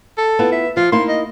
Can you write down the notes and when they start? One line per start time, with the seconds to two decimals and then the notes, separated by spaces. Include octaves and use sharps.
0.18 A4
0.39 B3 E4 F4
0.52 E5
0.77 F3 F4
0.92 A#3 D#4 E4 C6
1.09 D#5